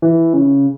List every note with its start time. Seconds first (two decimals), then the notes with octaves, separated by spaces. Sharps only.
0.02 E3
0.34 C#3